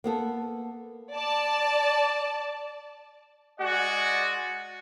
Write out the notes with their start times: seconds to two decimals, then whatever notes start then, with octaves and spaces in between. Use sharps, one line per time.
0.04 A#3 B3 A4
1.15 D5 A5
3.60 G#3 F#4 D5 F#5 G#5